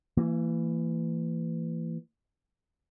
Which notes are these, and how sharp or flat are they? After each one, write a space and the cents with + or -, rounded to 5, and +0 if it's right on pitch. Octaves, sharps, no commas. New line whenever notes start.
E3 +15 A#3 -35